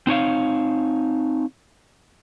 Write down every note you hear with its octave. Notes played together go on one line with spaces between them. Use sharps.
C4 D#4 C#5 F5